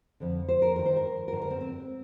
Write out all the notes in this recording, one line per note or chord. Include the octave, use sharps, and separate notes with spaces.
F2 D3
C5
A#4
G2 D#3 A#4
C5
A#4
A#4
G2 D3 C5
A#4
C4
C4